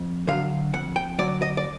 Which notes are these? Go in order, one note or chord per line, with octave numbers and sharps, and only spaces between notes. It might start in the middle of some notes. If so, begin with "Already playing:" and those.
Already playing: F2
D3 F#3 F5
F2 F#5
G5
D3 F#3 D5
D#5
D5